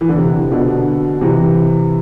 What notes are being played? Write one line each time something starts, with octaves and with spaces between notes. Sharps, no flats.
E3
D3
C3
B2 D3
C3 E3